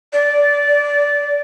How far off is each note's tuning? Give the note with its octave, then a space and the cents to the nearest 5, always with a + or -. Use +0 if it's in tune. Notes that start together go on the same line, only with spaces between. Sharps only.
D5 -15